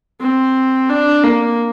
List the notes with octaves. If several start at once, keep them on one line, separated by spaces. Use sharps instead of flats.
C4
D4
A#3